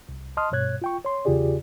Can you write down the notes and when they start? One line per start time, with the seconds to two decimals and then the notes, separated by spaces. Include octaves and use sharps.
0.09 C2
0.37 D#5 A5 C6 D#6 F6
0.52 G2 B2 C#5 F#6 G#6
0.82 F4 G5 C#6
1.05 C#5 C6
1.25 E2 C#3 F4 G4 G#4 D5